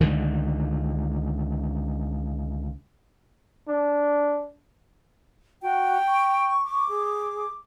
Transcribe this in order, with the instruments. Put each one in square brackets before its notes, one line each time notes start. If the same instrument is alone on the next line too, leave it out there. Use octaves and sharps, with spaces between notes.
[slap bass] C#2 D3 D#3
[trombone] D4
[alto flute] F#4 [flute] G5
[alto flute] C#6
[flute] D6
[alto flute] G#4